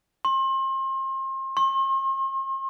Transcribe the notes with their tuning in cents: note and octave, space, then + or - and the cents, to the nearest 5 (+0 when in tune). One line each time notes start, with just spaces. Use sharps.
C6 +35
C6 +45